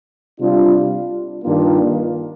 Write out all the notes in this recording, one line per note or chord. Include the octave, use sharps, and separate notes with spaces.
C3 G3 D4 F4
G2 D#3 A#3 D4 F4